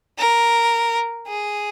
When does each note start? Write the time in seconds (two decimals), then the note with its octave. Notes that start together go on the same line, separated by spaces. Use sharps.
0.18 A#4
1.28 G#4